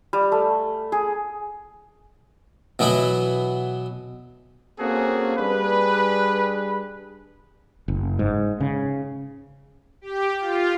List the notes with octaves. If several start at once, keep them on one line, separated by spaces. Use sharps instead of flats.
G3
A3
G#4
B2 E3 F#3 B3 E4
A#3 C4 C#4 F#4 G#4 A4
G3 D4 G#4 B4
F#1
G#2
C#3
G4
F4